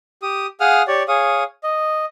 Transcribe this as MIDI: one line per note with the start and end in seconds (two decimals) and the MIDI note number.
0.22 0.47 67
0.22 0.47 87
0.60 0.82 68
0.60 0.82 77
0.60 0.82 78
0.60 0.82 87
0.60 0.82 89
0.87 1.03 67
0.87 1.03 73
0.87 1.03 74
1.08 1.43 68
1.08 1.43 73
1.08 1.43 77
1.08 1.43 87
1.63 2.05 75